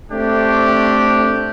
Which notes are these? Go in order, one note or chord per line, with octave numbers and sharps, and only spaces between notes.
A3 C4 D4 G4